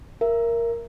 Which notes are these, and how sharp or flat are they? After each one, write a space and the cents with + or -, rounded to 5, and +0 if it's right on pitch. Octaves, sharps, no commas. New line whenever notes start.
A#4 +0 E5 +30